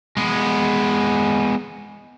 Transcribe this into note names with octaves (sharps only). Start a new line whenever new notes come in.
G#3 B3